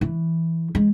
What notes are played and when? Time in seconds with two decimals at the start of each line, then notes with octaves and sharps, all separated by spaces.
0.01 E3
0.75 G#3